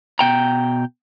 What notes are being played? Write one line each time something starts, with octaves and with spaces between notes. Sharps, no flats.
B2 G5 A#5